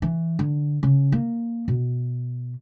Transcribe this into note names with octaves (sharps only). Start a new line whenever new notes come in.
E3
D3
C#3
A#3
B2